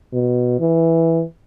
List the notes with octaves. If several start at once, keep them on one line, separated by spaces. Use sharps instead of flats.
B2
E3